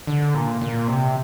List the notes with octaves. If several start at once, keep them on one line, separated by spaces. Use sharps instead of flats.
D3
A#2
A#2
C3